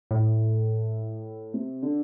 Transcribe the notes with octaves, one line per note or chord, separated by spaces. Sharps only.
A2
C3
D3